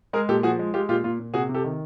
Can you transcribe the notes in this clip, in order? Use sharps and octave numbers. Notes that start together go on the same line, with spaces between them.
G#3 G#4 A#4
A#2 G4 A4
F3 F#4 G#4
G#3
G#3 F4 G4
A#2 F4 G4
A#2 F4
A#2
C3 F#4 G#4
C3
G4 A4
D#3